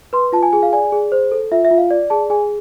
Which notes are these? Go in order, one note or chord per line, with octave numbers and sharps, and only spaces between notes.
B4 C6
F4 A5
G#5
G#4 G#5
F5
D5 G#5
G#4
C5
A4
F4 E5
E5
F4
F5
D5
G#4 A5
G#4 G#5